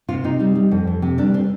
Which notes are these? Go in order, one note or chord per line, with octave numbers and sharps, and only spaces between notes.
C3 F4
C3 D#4
G3 D#4
G3
F2
F2
C3
G3 D4
C4